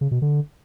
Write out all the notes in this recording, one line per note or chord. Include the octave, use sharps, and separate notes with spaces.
C#3
B2
D3